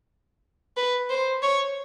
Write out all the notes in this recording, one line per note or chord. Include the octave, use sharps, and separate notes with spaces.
B4
C5
C#5